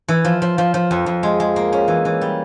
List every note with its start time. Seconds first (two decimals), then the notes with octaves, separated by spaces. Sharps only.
0.08 E3
0.25 F3
0.42 F3
0.58 F3
0.74 F3
0.91 F2
1.06 F2
1.23 G#3
1.40 G#3
1.56 A#3
1.73 C#4
1.88 E3
2.05 E3
2.21 G3